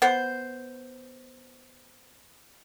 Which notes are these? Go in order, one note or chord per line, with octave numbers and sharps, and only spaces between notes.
B3 C5